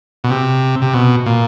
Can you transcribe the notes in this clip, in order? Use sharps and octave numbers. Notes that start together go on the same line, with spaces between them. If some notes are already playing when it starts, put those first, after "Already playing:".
B2
C3
C3
B2
A#2